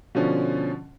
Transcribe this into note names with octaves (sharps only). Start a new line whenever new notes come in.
B2 D3 F3 C#4